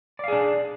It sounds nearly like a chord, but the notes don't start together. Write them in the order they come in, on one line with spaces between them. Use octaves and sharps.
D5 F5 G#4 D4